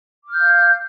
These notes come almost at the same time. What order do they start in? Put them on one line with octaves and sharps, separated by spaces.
D6 F6 G6 F5